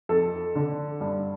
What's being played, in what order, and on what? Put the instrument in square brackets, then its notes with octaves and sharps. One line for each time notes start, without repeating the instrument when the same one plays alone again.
[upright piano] F2 A4
D3
G2